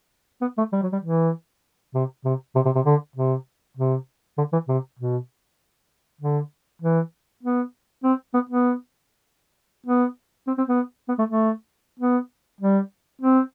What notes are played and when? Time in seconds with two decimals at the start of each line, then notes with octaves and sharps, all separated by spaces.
0.42 B3
0.58 A3
0.73 G3
0.83 F#3
0.92 G3
1.03 E3
1.95 C3
2.25 C3
2.55 C3
2.65 C3
2.75 C3
2.86 D3
3.16 C3
3.77 C3
4.38 D3
4.53 E3
4.68 C3
4.99 B2
6.21 D3
6.82 E3
7.43 B3
8.04 C4
8.34 B3
8.50 B3
9.86 B3
10.47 C4
10.58 C4
10.68 B3
11.08 B3
11.19 A3
11.29 A3
12.00 B3
12.61 G3
13.22 C4